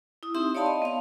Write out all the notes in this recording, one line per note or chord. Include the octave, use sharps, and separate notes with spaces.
E4 D#6
C4 D#4 G4 E5 C6 D#6
C#5 D5 F5 A5 B5 C6
D#5
B3 F5